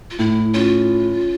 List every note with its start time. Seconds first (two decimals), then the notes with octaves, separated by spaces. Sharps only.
0.11 F4
0.19 A2 E4
0.54 C#4 F4